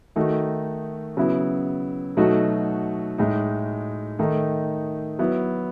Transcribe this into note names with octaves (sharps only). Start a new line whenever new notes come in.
D#3 A3 D#4 F#4
C#3 F#3 B3 E4
B2 F#3 A3 D#4 F#4
A2 G#3 D#4
D#3 A3 D#4
F#3 B3 E4